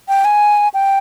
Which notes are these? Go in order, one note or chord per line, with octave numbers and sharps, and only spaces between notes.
G5
G#5
G5